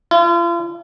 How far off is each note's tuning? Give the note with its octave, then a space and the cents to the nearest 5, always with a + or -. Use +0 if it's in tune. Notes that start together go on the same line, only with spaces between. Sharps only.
F4 -40